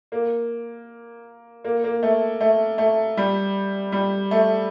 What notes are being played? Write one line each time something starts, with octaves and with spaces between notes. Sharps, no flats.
A#3
A#3
A#3
A3
A3
A3
G3
G3
A3